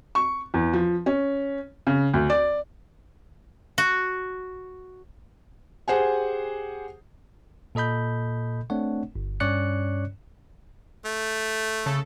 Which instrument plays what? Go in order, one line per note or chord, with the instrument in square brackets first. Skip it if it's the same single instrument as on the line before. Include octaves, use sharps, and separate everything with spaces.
[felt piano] C#6
E2
F3
C#4
C#3
D2
D5
[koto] F#4
[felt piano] G4 G#4 C5 F#5 G#5
[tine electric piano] A#2 A4 D#5 B5 G6
A3 C4 D4 C#5 F#5
G1
G2 C#4 C#5 D5 F#6 C#7
[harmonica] A3
[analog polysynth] C#3 A4